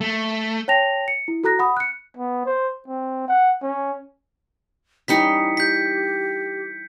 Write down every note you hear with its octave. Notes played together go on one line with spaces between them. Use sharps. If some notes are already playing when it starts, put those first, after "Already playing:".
A3
C#5 G5 A5 A#6 F7
C#7
E4
F#4 A4 A#5 F#6 A#6
F#5 B5 D#6
F#6 C#7
B3
C5
C4
F#5
C#4
E3 G3 C#4 D#4 B6 C#7
G4 G6 B6